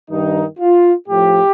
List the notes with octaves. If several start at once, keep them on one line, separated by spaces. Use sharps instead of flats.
G2 D#3 D#4
F4
A2 F3 G4